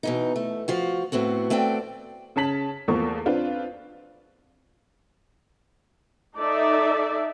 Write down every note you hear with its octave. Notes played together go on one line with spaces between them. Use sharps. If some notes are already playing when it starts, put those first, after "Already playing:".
B2 E3 D#4
A3
F3 F4 F#4
A2 B3 C4 F#4
A3 C4 F#4 D5 G5
C#3 C#4 A5 B6 F#7
E2 F3 A3 A#3 A4 C#6
C4 D4 F4 B4
D#4 A4 D5 E5